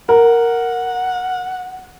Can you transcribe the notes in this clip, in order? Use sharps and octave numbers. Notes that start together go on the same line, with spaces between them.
A#4 F#5